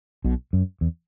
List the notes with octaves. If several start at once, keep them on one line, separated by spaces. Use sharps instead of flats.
B1 B2
F#2
E2